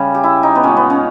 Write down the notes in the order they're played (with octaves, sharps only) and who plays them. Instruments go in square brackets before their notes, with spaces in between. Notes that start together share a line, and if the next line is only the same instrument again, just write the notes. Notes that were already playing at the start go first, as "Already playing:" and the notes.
Already playing: [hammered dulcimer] C#3 G3
G4
E4
D#4
B3
A#2 G#3 C#4
B3
C#4